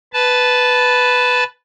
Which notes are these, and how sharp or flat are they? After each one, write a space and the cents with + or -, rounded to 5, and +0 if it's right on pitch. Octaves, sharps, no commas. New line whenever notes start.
B4 +5 A5 -10